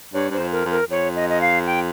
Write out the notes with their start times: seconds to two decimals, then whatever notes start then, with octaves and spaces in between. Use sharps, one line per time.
0.14 G2 C#5
0.31 G2 C5
0.39 F2
0.52 A#4
0.65 F2
0.71 A#4
0.91 F2 C#5
1.16 D#5
1.29 D#5
1.41 F5
1.66 G5